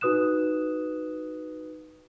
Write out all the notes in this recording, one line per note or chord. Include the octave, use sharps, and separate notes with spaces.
D#4 F#4 B4 D#6 F#6 E7